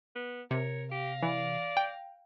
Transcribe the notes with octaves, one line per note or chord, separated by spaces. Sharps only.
B3
C3 A#4 C#5
G4 F5 A#6
E3 D5
G5